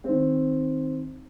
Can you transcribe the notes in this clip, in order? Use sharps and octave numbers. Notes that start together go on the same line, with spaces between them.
D#3 C4